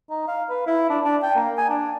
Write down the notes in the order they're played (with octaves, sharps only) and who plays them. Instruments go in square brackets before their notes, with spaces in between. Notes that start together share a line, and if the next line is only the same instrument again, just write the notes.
[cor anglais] D#4
F5
B4
E4
D4
D4
G5
A#3
G#5
D4